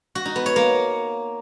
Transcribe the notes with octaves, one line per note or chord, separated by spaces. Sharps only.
F#4
D#4
B3
C#5
A#3